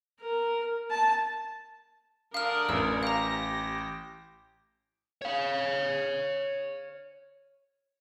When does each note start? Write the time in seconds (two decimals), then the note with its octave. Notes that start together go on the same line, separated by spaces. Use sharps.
0.20 A#4
0.90 A5
2.34 D3 A#4 D5 F5 D#6 F6
2.69 A1 E6
3.03 F5 G5 A#5 D6 A#6
5.22 C#5 F5